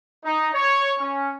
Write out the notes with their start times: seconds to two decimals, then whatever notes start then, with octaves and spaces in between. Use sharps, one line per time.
0.25 D#4
0.54 C#5
0.99 C#4